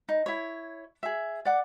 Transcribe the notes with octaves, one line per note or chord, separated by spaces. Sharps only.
D#4
E4 C#5
G#4 E5
D5 F#5 D6